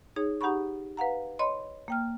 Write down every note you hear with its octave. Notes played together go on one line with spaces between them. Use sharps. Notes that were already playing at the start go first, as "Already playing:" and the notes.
D#4 G#4 C#5
D#4 G4 F#5 A#5 B5 C#6
B4 F5 F#5 A#5
C#5 D#5 B5 C6
A#3 G5 F6